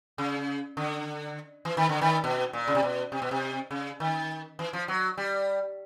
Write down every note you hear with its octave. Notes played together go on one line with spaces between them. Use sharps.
C#3
D3
E3
D#3
D3
D#3
B2
A#2
C#3
C3
B2
C3
B2
C3
C#3
D#3
E3
F3
F#3
G3